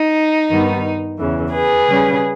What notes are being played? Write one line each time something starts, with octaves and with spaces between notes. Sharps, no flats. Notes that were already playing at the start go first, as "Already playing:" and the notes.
Already playing: D#4
G2 D#3 G3 B3
E2 C#3 E3
G#4 B4
C#3 G3 C#4